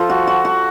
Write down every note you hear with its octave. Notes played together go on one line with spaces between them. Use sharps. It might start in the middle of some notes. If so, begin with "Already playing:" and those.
Already playing: F3 A4
F#4
F#4
F#4